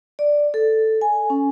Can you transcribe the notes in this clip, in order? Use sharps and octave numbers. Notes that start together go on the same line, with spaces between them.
D5
A4
G#5
C#4